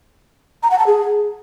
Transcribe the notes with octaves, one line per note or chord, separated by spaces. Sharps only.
A#5
F#5
A5
G#4